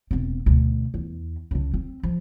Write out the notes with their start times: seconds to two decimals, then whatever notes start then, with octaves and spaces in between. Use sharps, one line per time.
0.11 E1 C4
0.46 D2 B2
0.94 E2
1.51 C#2 D3
1.74 C4
2.03 F3